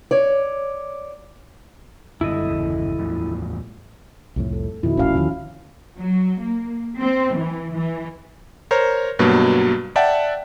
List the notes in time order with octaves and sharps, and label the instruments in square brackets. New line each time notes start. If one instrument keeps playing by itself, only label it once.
[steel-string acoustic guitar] C#5 D5
[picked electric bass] F#2 D3 G3 [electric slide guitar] E4 A4 D#5
[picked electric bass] G1 E2 C#3
E2 A2 F3
[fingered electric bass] C2 F2 A2
[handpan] A4
[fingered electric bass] F2 B2 D#3 [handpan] E4 F#4
[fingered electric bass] D#1 A1 [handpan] C#4 F#4 F5
[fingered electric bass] D#2 D3 F3 [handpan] D#3
[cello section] F#3
A#3
C4
E3
E3
[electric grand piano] A#4 C5 C#5 A#5 F6
G2 B2 F#3 A#3
D5 E5 F#5 G5 A5